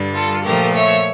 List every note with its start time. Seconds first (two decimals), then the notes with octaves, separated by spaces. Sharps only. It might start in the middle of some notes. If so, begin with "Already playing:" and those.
Already playing: G2 D3 G3
0.14 F4 A4
0.44 A#2 F3 A3 G4 A#4
0.74 C#5 E5